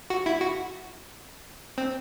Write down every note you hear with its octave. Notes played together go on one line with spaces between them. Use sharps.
F#4
E4
F#4
C4